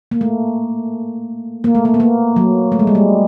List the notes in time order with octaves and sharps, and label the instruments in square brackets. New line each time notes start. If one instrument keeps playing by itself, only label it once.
[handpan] A#3
A3
A#3
A3
A#3
B3
A#3
F#3
A3
G#3
G3
G#3